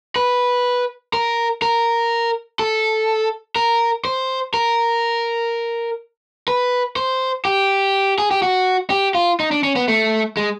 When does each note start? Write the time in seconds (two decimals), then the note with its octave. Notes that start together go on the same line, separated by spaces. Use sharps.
0.16 B4
1.13 A#4
1.62 A#4
2.59 A4
3.56 A#4
4.05 C5
4.54 A#4
6.48 B4
6.96 C5
7.45 G4
8.18 G#4
8.31 G4
8.42 F#4
8.90 G4
9.15 F4
9.40 D#4
9.51 D4
9.63 C#4
9.76 B3
9.88 A3
10.37 G#3